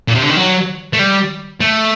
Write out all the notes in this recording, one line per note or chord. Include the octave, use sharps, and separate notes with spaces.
A#2
C3
D3
D#3
F#3
A3
G3
A3